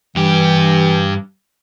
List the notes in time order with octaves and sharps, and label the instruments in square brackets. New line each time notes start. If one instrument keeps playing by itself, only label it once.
[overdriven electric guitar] G2 G4 [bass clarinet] E3